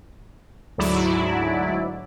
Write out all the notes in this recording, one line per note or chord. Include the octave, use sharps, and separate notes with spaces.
D2 G#2 F#3 E4 D5